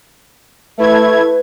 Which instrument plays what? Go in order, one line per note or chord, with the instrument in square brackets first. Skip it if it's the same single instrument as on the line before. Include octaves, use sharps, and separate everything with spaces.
[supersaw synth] A3 E4 G#6 [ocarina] B4